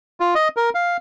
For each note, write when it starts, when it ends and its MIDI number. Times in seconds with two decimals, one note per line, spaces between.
0.20 0.34 65
0.35 0.48 75
0.57 0.70 70
0.75 0.97 77